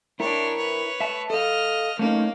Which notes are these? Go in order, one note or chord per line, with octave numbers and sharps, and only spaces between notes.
D4 E4 A#4 C#5
B4 C#5
E5 A5
A4 D#5 F5 F6
A3 A#3 C#4 D#4